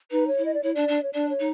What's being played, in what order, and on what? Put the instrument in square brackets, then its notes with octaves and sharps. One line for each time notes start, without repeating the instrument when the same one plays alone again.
[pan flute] D#4 [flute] B4
[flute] C#5
[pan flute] E4
[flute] D#5
D5
[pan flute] E4 [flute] C#5
[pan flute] D4 [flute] D5
[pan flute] D4
[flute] C#5
[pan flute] D4 [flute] D5
[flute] C#5
[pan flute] D#4